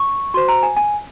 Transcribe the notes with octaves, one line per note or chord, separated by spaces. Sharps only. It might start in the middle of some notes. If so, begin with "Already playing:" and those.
Already playing: C#6
F#4 C5 C6
A#5
G#5
G#5